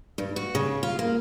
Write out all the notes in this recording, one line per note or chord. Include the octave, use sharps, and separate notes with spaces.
G2
F#4
C#3
F4
A#3